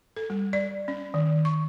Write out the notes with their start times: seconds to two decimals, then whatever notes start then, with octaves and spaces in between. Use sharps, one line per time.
0.16 A4
0.30 G3
0.53 D5
0.88 C#4
1.14 D#3
1.45 C#6